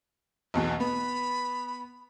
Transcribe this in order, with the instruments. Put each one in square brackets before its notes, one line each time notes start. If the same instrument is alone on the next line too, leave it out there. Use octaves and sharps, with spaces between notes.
[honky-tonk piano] B1 E2 B2
[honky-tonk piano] B3 [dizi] B5